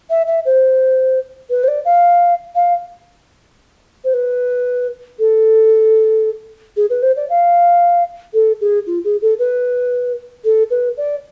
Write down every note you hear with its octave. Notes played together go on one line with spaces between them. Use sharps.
E5
E5
C5
B4
C5
D5
F5
F5
C5
B4
A4
G#4
B4
C5
D5
F5
A4
G#4
F4
G#4
A4
B4
A4
B4
D5